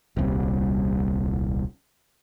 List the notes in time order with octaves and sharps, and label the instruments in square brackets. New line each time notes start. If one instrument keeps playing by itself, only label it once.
[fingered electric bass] D#1 C2 G3